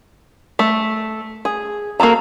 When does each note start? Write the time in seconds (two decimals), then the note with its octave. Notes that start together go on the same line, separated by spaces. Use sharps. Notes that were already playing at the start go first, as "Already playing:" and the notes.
0.59 A3
1.45 G#4
2.00 A#3 F#4 A4 A#5